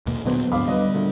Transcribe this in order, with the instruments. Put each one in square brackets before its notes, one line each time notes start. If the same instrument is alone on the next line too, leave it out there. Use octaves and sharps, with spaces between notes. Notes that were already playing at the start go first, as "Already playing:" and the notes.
[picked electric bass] D#2 B2 A#3
[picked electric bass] A#2 F#3 [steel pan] D3 B3 C5
[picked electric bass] D#2 G#2 [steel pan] D3 F#3 [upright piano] F5 B5 D6
[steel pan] D3 D4 [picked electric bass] G3 [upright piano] B4 D#5
[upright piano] D2 A#2 A3